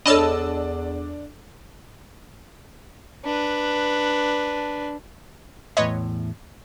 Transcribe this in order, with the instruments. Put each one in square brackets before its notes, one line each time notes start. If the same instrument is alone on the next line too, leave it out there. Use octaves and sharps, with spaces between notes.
[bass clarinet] E2 [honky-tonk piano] D4 [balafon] A4 C#5 B5 [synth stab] D#5 A5 E6
[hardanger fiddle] D4 B4
[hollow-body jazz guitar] E2 A2 C6 [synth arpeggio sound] B4 C#5 D#5